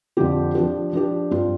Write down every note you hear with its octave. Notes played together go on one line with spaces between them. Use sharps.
F2 D3 F3 C4 G4
F3 D4 G4
F3 D4 G4
G2 G3 C4 F4